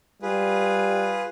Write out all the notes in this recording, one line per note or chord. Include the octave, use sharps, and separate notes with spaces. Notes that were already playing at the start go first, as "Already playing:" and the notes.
G3 F4 G#4 B4